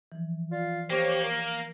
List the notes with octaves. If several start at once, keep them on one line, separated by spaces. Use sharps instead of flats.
E3 F3
F4 D5
A#3 G4 C5 C#5
A#4 D7